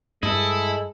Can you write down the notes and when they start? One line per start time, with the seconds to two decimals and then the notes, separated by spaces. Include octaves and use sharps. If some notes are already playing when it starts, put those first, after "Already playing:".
0.23 G2 G#3 E4 A4 D#5